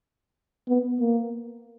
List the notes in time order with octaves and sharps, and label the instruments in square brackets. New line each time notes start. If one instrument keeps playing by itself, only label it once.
[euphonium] B3
A#3